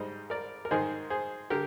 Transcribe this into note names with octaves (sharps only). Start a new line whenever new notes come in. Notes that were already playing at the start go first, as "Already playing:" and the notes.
Already playing: G#2 G3 C5 D#5
A#4 D5
A#4
G#2 D#3 G#3 G#4 C5
G#4 C5
D3 G4 A#4